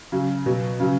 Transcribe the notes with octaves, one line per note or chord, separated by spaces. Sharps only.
C#3 F#3
B2 F#3
C#3 F#3